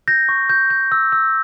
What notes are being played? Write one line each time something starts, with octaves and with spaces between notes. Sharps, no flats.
G6 A#6
C#6
G6
G6
E6
E6